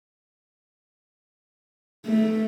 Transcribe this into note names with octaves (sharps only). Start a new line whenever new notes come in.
A3